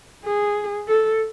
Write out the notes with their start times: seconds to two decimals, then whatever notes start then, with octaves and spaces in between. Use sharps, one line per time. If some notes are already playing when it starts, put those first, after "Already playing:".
0.25 G#4
0.88 A4